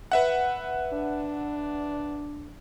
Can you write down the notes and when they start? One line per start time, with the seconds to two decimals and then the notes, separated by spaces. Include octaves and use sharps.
0.12 B4 E5 F#5
0.93 D4